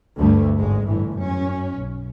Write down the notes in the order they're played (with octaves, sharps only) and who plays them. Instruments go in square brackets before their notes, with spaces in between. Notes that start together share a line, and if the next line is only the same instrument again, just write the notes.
[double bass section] D2 G2 G3 A3
G#1 G#3
G1 A2 E3
F#2 C#4
B1